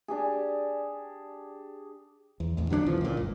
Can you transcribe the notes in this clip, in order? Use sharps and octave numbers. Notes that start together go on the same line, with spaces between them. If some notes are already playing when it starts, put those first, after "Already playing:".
D4 G4 G#4
E2
A1 E2
D3 F#3 B3 D4
B1 F2 E3 F3
C#2 A#2
G1